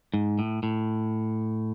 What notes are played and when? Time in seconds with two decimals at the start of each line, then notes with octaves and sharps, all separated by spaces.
0.14 G#2
0.39 A2
0.63 A2